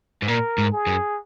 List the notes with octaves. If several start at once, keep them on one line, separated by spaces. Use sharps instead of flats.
G#2
A#2 A#4
G#2
G#4
F#2